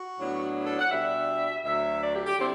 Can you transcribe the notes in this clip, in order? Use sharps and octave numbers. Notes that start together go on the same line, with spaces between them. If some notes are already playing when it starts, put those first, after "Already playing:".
Already playing: F#4
A2 F#3 B3 D4
A4
F#5
B2 G3 D4 E5
D2 D3 F#3 E5
D5
G4
G4
D3 G3 C4 E4 C5